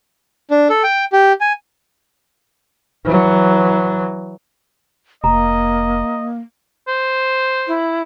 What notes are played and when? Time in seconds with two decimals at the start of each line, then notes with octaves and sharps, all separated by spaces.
0.51 D4
0.70 A4
0.84 G5
1.13 G4
1.41 G#5
3.05 E3 F#3
5.24 F1 A#3 D#5 A#5
6.88 C5
7.68 E4